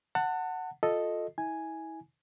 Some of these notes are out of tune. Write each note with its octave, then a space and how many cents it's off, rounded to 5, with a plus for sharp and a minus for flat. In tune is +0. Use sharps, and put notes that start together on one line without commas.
F#5 +0 A5 +30
F4 +30 A4 +0 D#5 +0
E4 -35 G#5 +0